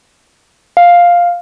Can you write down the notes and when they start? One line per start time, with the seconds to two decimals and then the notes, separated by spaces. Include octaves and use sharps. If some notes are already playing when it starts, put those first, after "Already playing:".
0.77 F5